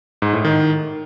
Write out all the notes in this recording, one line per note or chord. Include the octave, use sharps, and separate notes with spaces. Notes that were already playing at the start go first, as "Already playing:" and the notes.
G#2
A2
D#3